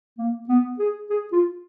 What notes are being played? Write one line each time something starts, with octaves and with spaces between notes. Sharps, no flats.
A#3
B3
G#4
G#4
F4